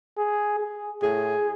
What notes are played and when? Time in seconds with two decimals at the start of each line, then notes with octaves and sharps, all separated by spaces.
0.18 G#4
0.60 G#4
1.02 A2 G#4